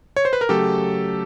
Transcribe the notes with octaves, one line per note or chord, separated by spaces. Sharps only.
C#5
C5
B4
A#4
C#3 F#3 A3 G4 A4